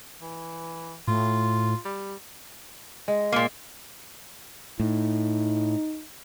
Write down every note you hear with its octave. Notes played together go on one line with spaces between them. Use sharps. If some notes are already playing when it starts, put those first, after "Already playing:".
E3
A2 F4
G3
G#3
A#2 A#3
A2 D#4